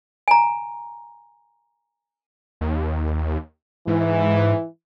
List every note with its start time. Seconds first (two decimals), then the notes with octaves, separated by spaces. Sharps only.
0.28 G#5 A#5
2.61 D#2
3.87 G#2 E3